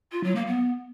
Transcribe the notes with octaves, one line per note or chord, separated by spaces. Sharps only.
F4
F#3
A#3
B3